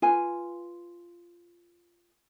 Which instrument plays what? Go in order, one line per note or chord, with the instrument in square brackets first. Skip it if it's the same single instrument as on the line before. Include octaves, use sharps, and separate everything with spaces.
[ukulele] F4 B4 G#5